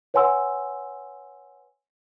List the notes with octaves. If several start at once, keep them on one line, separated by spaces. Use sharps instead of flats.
B4 C#5 F#5 G#5 C6 E6